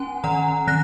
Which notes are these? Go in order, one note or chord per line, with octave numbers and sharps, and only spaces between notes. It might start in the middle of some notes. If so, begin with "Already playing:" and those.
Already playing: C#4 F#5 G#5
D#3 F#5 A#5
D#3 F#6 A#6